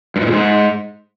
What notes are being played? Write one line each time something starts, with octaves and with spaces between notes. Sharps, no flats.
G2
G#2
A#2
G#2